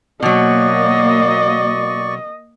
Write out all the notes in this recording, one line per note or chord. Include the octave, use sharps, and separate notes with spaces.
B2 F#3 A#3 D5 D#5 C#6